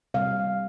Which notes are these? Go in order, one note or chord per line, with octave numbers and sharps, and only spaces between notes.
C3 G3 A#3 F5